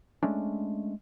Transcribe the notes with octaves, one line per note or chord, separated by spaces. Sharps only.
G#3 A3 C#4 D4